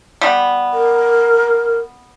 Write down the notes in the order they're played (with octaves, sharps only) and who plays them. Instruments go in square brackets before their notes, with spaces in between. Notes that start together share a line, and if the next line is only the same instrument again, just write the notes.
[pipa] G3 B3
[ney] A#4